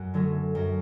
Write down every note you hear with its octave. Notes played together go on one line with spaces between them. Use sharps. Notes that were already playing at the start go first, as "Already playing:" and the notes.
Already playing: F#2 F#4
D3 F#3 A3 C#4
F#2